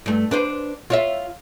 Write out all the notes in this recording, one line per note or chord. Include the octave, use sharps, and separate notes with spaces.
G2 A3
D4 B4 C5
F4 C#5 E5